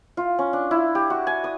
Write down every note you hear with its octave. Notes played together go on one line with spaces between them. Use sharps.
F4
C#4
D4
E4
G4
F#4
G#5
D#6